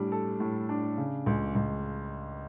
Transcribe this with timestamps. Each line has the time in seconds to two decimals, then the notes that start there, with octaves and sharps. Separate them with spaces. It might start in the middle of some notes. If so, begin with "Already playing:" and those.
Already playing: A2 G3 D4
0.12 A4
0.40 A2
0.69 D4
0.98 C#3
1.26 C#2
1.55 C#2